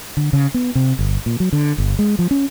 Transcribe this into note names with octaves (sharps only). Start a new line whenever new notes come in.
D3
C#3
B3
C3
G1
A#2
F#3
D3
G1
G#3
F3
C#4